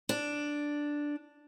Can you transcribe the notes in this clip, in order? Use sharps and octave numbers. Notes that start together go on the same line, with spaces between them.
D4